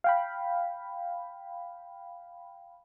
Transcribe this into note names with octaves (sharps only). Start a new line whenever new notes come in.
F5 G5 B5